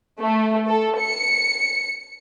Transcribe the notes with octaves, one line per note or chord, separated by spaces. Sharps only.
A3
A4
C#7